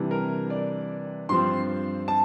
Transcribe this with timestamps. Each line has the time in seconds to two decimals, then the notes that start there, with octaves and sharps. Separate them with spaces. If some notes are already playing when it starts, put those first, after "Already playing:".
Already playing: C3 E3 G3 D4
0.11 A#4
0.50 D5
1.29 G2 F3 C4 C6
2.08 A5